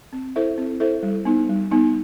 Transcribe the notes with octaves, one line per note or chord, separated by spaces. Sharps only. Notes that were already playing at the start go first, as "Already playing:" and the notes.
C4
E4 A4 C5 E5
C4
E4 A4 C5 E5
G3
B3 D#4
G3
B3 D#4